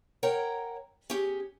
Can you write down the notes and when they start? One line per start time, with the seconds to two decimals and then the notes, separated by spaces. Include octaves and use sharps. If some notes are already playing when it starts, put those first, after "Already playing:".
0.23 A#4 C#5 F#5 G5 A#5
1.10 C#4 G4 G#4